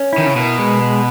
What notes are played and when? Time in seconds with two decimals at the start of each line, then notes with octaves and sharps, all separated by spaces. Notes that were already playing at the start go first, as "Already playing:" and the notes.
Already playing: C#4
0.13 E4
0.18 D#3
0.26 C#3
0.35 B2 A#4
0.59 G#3
0.82 G#3